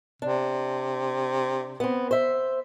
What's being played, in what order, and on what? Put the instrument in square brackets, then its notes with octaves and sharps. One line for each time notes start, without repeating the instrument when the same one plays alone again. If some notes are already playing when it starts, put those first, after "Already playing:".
[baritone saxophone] C3 [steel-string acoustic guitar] D4
[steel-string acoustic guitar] B3 C4
C5 E5